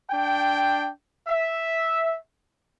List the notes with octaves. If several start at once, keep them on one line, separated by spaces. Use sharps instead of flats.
D4 G5
E5